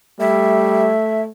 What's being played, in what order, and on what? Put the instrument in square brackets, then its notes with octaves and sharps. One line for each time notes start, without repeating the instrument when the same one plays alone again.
[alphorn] G3 [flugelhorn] A3 [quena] E5